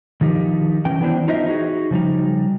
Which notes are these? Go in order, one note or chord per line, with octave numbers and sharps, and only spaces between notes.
D#3 F3 D#4 G4
E3 C#4 G5
E3 A3 B3 D4 E4 C5
D#4 F4 C5 D#5 E5
D#4 F#4 G#4
C#3 F3 G3 D#4